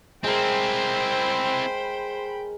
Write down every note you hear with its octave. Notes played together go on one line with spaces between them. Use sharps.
G#3 C4 E4 A#4 C5 G5 B5